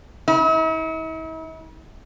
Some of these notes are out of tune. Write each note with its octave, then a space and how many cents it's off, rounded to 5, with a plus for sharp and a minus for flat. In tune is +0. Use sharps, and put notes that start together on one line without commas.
E4 -45